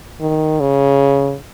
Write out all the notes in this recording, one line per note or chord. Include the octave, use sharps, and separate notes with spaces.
D#3
C#3